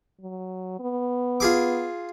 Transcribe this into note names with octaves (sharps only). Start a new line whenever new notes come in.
F#3
B3
F4 G#4 D6